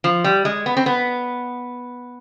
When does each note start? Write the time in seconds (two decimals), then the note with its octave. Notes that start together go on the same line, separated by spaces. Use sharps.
0.04 F3
0.24 G3
0.45 G#3
0.66 B3
0.77 C4
0.86 B3